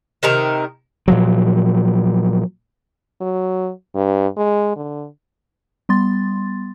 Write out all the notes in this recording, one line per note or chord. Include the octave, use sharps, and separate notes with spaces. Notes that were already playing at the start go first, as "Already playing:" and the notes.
C3 D#3 A#4 A#5
A#2 F3 F#3
F#3
G2
G#3
D3
G3 B3 C6 A6